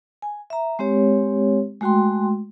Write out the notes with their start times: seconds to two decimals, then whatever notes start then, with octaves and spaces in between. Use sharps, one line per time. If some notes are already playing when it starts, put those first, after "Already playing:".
0.22 G#5
0.50 E5 A#5
0.79 G#3 C4 G4 C#5
1.81 G#3 A3 F#4 G5 C6